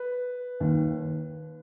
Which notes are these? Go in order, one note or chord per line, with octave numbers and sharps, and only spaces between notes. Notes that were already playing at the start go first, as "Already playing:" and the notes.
Already playing: B4
D#2 D#3